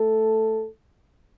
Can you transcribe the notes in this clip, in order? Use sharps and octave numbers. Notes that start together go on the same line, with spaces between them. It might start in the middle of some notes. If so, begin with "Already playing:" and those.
Already playing: A3 A4